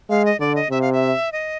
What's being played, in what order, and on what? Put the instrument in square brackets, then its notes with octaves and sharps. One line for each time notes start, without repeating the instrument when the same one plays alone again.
[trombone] G#3 [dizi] F5
[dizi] D#5
[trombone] D3 [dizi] D5
[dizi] D#5
[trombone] C3 [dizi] E5
[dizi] F5
E5
D#5